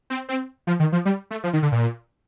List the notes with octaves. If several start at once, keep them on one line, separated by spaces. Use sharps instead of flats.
C4
C4
F3
D#3
F3
G3
A3
F3
D#3
D3
A#2